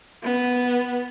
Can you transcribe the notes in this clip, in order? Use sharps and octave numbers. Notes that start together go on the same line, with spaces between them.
B3